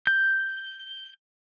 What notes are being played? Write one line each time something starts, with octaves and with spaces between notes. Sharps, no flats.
G6